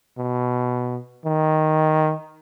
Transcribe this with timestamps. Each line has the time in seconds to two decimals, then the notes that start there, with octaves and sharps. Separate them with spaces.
0.18 B2
1.25 D#3